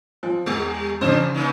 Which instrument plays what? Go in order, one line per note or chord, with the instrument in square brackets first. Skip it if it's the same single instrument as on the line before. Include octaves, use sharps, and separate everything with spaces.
[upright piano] F3
[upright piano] E2 [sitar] G3
[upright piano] C#3 [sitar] E3 D4 C5
[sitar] A#3 C#4 D#4